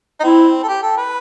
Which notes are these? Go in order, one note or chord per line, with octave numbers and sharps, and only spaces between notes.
D#4
C4 E4
A4
G4
A4
B4